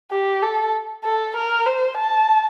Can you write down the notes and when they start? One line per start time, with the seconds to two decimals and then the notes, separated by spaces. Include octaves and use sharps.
0.11 G4
0.42 A4
1.04 A4
1.36 A#4
1.66 C5
1.98 A5